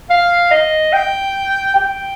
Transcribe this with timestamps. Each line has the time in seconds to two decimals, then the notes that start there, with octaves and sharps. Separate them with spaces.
0.10 F5
0.51 D#5
0.93 G5
1.75 G5